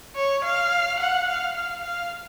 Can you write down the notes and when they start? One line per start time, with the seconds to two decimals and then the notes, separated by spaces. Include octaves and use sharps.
0.15 C#5
0.44 F5
0.99 F#5
1.27 F5
1.56 F5
1.83 F5